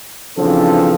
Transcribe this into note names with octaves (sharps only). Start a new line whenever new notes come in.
C#3 E3 F3 C4 D4 A4